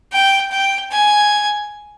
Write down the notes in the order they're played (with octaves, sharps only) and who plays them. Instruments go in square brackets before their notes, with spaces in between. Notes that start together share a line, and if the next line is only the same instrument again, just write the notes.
[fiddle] G5
G5
G#5